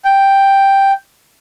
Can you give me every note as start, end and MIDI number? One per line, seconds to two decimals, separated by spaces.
0.05 0.91 79